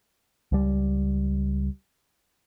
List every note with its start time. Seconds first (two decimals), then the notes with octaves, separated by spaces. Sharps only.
0.52 C#2 G3